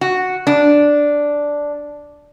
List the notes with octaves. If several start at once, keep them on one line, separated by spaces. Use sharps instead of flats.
F#4
D4